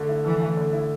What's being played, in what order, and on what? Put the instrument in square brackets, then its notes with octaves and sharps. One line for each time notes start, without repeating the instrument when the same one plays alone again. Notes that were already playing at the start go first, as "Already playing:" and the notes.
Already playing: [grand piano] D3 A3
E4
[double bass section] E3 [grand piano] A4
[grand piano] A3
D3
E4